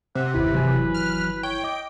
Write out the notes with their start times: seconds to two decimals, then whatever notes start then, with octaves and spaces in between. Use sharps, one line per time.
0.15 C3 F#5
0.34 G1 D#2 E4 B4
0.55 E3 F#3 G#5
0.94 F6
1.43 C#5 G5
1.64 D#5 D6